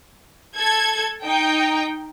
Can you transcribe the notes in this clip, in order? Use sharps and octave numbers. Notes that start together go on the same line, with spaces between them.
A4 G#6
D#4 G5